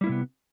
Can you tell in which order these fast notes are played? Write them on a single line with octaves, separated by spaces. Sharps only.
G3 E4 A#3 C3 B3